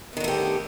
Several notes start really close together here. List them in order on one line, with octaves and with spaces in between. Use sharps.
B3 D#3 D3 A3 G4